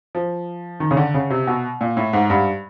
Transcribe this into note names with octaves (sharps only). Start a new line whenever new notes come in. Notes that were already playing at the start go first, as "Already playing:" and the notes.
F3
D#3
C#3
D3
C#3
C3
B2
A#2
A2
G#2
G2